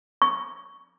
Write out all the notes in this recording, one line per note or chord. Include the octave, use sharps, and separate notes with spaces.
C#6